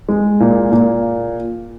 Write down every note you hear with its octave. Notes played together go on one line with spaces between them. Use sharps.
G#3
A#2
A#2